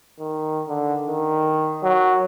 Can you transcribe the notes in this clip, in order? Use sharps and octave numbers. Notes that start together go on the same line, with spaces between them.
D#3
D3
D#3
F#3